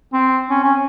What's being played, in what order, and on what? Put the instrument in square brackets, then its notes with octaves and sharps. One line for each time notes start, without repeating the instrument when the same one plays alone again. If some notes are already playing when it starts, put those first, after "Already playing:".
[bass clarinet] C4
C#4
C#4